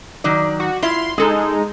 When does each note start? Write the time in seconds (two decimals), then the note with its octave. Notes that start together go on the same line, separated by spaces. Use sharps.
0.24 D#3 F#3 D5
0.60 F#4
0.83 E4 F4 E5 C6
1.18 G#3 D#4 G#4 A4